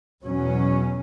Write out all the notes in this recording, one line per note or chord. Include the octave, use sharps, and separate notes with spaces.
E2 B2 F#3 C#4